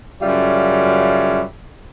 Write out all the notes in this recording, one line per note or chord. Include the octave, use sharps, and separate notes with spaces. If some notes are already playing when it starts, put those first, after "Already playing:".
F#2 C#3 G3 F4 C#5 E5